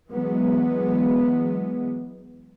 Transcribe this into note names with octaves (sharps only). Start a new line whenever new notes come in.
E3 F#3 G#3 B3